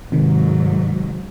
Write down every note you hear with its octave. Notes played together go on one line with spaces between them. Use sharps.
G#2 C3 D#3 F#3